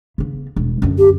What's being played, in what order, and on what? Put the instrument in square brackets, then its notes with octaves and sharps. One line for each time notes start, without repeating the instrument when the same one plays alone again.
[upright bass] C#3 B3
E1
F#2 D3
[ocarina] G4